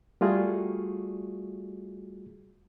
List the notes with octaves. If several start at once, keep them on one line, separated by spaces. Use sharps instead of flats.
G3 A3 F4 F#4 G#4